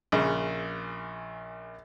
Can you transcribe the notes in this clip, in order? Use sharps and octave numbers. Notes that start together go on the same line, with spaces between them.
A#1 C#3